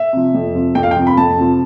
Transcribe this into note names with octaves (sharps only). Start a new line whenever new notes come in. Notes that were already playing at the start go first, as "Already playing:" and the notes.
Already playing: E5
C3 F3
F2
C3 F3
F2 G5
F5
G5
C3 F3
B5
F2 A5
C3 F3